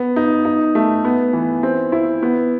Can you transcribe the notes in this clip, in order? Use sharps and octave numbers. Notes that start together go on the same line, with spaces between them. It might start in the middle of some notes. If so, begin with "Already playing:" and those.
Already playing: B3
D#4
D#4
A3
B3
E3
C4
E4
B3